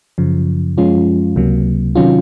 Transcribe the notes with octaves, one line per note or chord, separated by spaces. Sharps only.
F#2 C#3 F3
F#2 F3 G#3 C#4 F4
C#2 C3 F#3 A#3
C3 D#3 F#3 C#4 F4